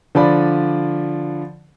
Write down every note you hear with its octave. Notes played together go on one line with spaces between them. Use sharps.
D3 F3 D5 B5